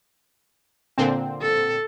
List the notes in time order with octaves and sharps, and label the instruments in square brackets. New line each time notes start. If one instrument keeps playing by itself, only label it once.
[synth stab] A#2 D3 C4
[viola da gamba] A4